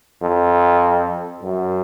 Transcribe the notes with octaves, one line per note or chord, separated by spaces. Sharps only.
F2
F#2